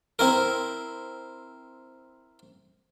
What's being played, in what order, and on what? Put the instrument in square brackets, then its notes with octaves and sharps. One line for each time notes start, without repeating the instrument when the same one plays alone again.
[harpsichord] C4 E4 A#4